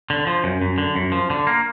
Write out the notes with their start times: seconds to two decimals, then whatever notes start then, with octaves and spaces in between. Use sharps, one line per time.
0.10 D3
0.27 F3
0.44 F#2
0.62 F#2
0.78 D3
0.96 F#2
1.12 F3
1.30 D3
1.47 A#3